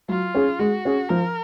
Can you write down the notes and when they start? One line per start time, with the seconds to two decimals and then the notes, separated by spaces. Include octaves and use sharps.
0.09 F#3 F4
0.35 C#4 G#4
0.59 G#3 F#4
0.85 C#4 G#4
1.10 F3 A#4